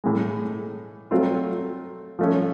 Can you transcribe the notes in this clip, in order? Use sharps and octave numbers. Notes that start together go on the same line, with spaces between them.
A2 E3 G#3
F#3 A3 C4 F4
F3 A3 C#4